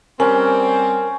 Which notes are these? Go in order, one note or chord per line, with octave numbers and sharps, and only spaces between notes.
G3 C4 C#4 A#4